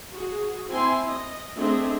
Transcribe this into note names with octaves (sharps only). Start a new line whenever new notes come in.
F#4 G#4
C4 E4 G#5 C6
D#5
A3 C4 D4 G#4 D#5 E5